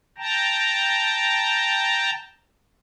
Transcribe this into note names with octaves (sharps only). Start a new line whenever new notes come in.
G5 A5 A#5